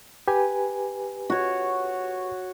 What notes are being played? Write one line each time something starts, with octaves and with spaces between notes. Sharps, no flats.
G4 B4 G#5
F#4 C#5